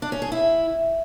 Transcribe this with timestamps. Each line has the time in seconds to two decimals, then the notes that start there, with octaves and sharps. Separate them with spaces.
0.02 D4
0.12 C#4
0.22 G#4
0.32 E4